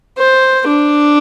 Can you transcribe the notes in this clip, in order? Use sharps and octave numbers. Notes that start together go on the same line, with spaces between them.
C5
D4